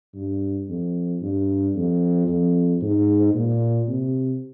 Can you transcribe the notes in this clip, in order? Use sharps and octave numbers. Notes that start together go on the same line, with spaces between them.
G2
F2
G2
F2
F2
G#2
A#2
C3